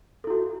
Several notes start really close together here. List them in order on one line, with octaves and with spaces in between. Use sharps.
A4 E4 F#4